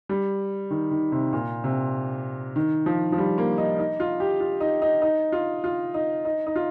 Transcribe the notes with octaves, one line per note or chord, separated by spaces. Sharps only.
G3
D#3
D#3
C3
A#2
C3
D#3
F3
F3
G3
A#3
D#4
D#4
F4
G4
F4
D#4
D#4
D#4
F4
F4
D#4
D#4
D#4
F4